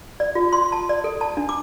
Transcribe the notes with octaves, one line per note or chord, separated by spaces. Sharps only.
D5
F4
C6
A5
D5
A4
A5
D4
D6